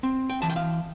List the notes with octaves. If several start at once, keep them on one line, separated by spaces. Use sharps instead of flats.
C4
G5
E3 A5
G5
F5